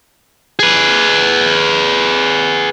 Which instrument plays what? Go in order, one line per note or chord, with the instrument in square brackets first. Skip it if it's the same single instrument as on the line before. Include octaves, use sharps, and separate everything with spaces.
[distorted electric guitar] G#4 B4